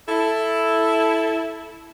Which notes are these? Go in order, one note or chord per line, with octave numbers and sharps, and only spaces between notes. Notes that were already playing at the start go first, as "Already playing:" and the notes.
E4 A4